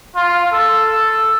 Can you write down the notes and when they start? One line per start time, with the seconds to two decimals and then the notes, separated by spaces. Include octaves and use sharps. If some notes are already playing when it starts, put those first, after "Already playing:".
0.16 F4
0.52 A4